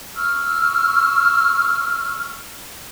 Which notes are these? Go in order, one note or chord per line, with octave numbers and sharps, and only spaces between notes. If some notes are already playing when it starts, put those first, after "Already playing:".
C#6 E6 F6